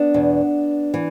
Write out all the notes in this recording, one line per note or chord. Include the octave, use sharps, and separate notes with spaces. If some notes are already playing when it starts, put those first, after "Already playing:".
Already playing: B3 D4
E2 B2
E3